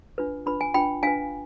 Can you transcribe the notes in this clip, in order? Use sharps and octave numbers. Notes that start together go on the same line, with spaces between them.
D4 F4 B4
D4 F4 B4 B5
G#5
D4 F4 B4 G5 B5
D4 F4 B4 F5 G#5